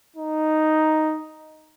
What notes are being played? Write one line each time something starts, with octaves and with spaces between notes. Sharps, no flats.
D#4